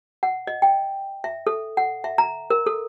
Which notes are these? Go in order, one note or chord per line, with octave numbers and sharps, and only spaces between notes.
F#5
D#5
G5
E5
A4
F#5
E5
A#5
A#4
A4